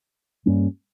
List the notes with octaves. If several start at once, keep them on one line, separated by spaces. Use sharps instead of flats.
G2 G3 A#3 C#4